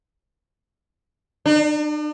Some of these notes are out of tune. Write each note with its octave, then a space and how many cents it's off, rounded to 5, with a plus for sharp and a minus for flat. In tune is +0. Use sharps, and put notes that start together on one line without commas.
D4 +45